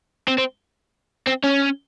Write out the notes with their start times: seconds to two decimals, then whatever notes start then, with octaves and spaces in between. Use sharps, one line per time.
0.28 C4
0.38 C4
1.27 C4
1.43 C#4